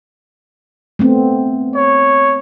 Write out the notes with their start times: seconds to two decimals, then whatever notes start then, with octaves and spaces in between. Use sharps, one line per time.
0.99 A3 B3 C4
1.74 C#5